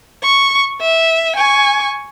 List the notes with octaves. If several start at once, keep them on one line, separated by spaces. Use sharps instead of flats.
C#6
E5
G#5 C#6